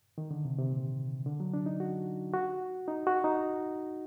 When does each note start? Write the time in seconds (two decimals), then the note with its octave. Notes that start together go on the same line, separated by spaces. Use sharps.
0.18 D#3
0.31 D3
0.45 C3
0.58 C3
0.72 A#2
1.26 D3
1.40 F#3
1.54 D4
1.66 D#4
1.80 F#4
2.33 F#4
2.88 D#4
3.07 F#4
3.24 D#4